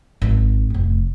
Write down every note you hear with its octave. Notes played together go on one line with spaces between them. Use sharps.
G#1
F1 A3